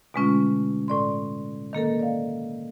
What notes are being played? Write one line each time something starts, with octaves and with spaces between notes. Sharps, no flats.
B2 D3 G#3 A3 C#4 F4
A2 D5 C6
D#3 A#3 A4 A#4
D5 F5